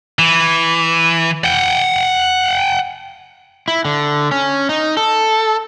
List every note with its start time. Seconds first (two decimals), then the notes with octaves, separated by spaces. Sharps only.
0.19 E3
1.44 F#5 G5
3.68 E4
3.85 D3
4.31 C#4
4.69 D#4
4.97 A4